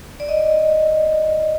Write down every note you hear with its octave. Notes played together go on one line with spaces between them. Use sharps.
D5
D#5